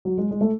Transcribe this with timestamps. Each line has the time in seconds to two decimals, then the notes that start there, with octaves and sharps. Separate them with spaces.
0.05 F#3
0.18 G#3
0.31 G#3
0.41 A3